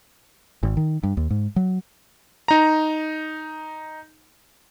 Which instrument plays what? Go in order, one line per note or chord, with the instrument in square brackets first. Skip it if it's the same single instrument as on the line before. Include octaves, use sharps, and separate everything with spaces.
[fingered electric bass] G#1
D#3
G2
D#2
G#2
F#3
[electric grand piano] D#4 A#5